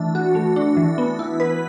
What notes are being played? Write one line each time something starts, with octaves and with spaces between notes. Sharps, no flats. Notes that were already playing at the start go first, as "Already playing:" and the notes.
Already playing: E3 A3 D4
F#4
A3
D4
E3
B3
E4
B4